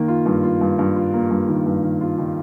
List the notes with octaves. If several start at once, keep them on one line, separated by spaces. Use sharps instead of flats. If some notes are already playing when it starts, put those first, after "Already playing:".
Already playing: D#3 A#3
F4
G2
F4
G2
G2
F4
A#3
G2
D#3
G2
D#3
F4
D#3